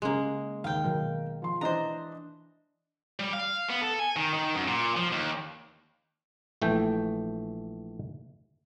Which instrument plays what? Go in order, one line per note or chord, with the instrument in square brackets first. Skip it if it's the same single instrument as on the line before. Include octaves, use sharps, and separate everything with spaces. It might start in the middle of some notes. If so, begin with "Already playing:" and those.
[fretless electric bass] C#3 C#4 [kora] G#3 A#3
[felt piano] D#2 [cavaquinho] F5 G5
[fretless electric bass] B2 D#3 F#3 [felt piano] A#4
[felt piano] F3 C6
[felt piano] E3 D4 D#5 [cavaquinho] C5 A#5
[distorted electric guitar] G3
F5
B3
A4
G#5
D#3
D#3
F#2
A#2
F3
D#2
[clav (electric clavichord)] A#1 E3 A3 G5